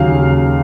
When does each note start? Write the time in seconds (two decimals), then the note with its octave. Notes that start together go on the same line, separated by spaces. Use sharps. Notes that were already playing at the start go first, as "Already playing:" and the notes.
Already playing: D#2 C#3 F#3 F5